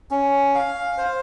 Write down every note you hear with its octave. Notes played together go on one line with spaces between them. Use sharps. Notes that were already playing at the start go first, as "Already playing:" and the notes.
C#4
F5
C5